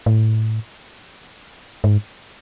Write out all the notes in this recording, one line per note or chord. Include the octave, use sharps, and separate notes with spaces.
A2
G#2